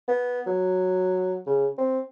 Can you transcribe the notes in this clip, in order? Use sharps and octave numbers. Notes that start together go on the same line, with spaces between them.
B3
F#3
C#3
C4